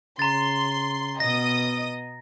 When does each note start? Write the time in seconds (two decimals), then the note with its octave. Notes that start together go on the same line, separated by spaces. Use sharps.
0.19 C#3 A#5 C6 A6
1.20 B2 B3 D#5 D#6 A#6